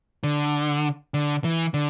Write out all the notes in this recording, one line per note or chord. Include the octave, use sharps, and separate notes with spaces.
D3
D3
E3
D3